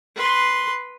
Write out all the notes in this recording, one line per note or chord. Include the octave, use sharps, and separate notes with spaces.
B4 C6